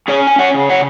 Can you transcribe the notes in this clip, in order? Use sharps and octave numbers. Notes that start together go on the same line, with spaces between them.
C#4 G#4 C#5
G#5
C#5 F#5
C#3
C#5 F#5